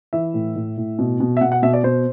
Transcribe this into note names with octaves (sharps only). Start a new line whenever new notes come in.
E3 E5
A2
A2
A2
B2
B2
E5
B2 F#5
F#5
B2 E5
D5
B2 C5